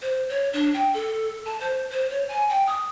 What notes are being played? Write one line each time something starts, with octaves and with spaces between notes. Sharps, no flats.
C5
C#5
D4
G5
A4
A5
C5
C5
C#5
G#5
G5
D#6